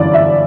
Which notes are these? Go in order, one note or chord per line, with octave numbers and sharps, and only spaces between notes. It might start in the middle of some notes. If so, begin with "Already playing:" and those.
Already playing: G1 F#2 E3 D5
E5